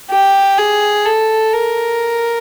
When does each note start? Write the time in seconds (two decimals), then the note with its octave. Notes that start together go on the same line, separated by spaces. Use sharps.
0.11 G4
0.58 G#4
1.05 A4
1.53 A#4